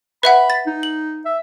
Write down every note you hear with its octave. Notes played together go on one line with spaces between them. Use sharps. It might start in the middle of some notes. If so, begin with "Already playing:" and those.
B4 E5 F#5 B5
A6
D#4
F#7
E5